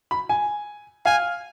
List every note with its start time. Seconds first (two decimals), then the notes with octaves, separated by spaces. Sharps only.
0.11 B5
0.29 G#5
1.05 F5 G#5